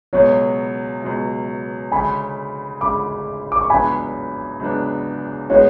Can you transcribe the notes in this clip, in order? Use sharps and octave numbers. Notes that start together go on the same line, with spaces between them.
C#2 B2 F#3 C#5
C#2 B2 F#3
D2 C#3 G#3 G#5 B5
D2 C#3 G#3 B5 D6
D6
C#6
C#2 C#3 F#3 B3 D4 G#5 B5
C#2 C#3 F#3 B3 D4
A2 G#3 B3 F#4 C#5